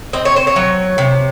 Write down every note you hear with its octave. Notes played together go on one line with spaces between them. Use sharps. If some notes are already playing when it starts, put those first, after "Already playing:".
C4 D#5
C#5
C5
C#5
F#3
C3